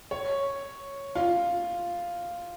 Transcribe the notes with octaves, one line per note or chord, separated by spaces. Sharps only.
C#5
F4